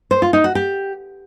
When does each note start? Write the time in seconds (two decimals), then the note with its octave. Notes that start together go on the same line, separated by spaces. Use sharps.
0.11 C5
0.22 F4
0.33 D#4
0.44 F#4
0.55 G4